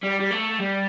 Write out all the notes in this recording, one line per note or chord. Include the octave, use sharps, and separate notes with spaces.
G3
G3
A3
G3